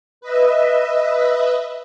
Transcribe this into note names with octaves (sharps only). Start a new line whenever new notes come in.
B4 D#5 E5